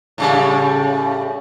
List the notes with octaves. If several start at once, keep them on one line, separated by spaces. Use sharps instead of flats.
A2 C#3 G3